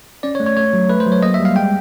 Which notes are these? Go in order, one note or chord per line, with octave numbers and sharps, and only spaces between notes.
C#4 D5
C#5
A3
C#5
A3 C#5
F#3
A3 B4
C5
F#3
C#5
A#3 D#5
E5
G3
F5
G#3 G5